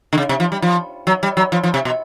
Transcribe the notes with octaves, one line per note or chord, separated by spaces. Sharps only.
D3
C#3
C3
F3
G3
F3
F#3
G3
F#3
F3
F3
C3
B2